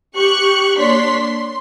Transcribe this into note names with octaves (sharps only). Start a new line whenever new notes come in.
G4 C#6 F#6 C#7
A#3 D4 C#5 C6 B6
C6